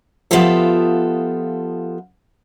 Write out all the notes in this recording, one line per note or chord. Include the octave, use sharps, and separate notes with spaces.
F3 B3 F4 G4 A4 E5